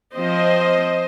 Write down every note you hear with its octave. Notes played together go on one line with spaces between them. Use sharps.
F3 C4 C5 D#5